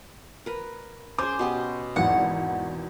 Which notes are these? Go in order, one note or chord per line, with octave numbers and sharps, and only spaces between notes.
A#4 B4
C#4 G#4 C5 D6
B2 B3 G4
G#1 E2 F#5